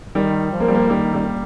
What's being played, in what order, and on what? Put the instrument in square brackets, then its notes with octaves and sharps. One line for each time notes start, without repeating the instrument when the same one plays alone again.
[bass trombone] D#3 [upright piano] G3
[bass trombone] F3
[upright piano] A#3
G3
A#3
[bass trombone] D#3 [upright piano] G3
[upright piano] G3